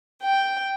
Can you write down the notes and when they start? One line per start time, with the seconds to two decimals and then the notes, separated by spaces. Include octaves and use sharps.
0.21 G5